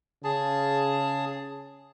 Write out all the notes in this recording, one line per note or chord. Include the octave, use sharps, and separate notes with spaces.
C#3 G#4 A5